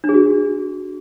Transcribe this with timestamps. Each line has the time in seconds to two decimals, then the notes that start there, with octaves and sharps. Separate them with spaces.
0.04 D4
0.09 G#4
0.14 F#4